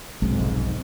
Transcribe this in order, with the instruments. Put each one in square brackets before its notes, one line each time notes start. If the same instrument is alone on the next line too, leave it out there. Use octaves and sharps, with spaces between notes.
[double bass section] F1 G#2 [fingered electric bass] B1 [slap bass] G#3 C4